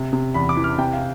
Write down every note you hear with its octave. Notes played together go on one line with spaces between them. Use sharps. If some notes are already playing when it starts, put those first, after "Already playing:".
Already playing: C3
C3
E2 B5
D6
E3
F6
C3 G5
F5